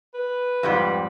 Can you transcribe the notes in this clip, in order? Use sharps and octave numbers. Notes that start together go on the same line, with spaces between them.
B4
F2 G#2 G3